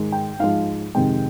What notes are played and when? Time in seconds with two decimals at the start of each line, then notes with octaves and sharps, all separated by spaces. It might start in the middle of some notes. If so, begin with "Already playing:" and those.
Already playing: G#2 D#3 G#3
0.12 G5
0.39 G#2 F3 G#3 F5
0.95 F2 C3 D#3 G#3 G5